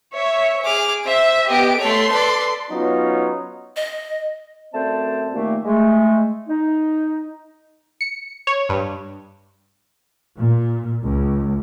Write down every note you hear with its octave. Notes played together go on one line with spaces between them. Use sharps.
C#5 E5
G#4 D6 F6
C5 E5
B3 G4 D#5 D7
A3 A4 C#5 C6
B4 D5
F#3 B3 C#4 D#4 F4
D#5
F#2 A3 C4 C5 D5 A5
D#2 A#2 D#3 A3 A#3
G#3 A3
D#4
C#7
C#5
G2
A#2
C#2